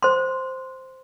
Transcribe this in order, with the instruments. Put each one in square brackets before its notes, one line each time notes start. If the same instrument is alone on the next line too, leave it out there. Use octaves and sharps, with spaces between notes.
[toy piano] C5 C6